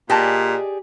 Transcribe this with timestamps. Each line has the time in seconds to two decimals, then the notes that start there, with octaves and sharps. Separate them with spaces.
0.10 A#2 G4 G#4 D5 D#5 A5